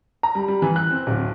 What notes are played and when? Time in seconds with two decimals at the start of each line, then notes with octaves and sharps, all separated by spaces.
0.23 A#5
0.35 G3
0.48 G3
0.62 E3
0.76 F#6
0.91 C4
1.07 D1